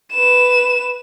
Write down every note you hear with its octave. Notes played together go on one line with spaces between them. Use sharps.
B4 E7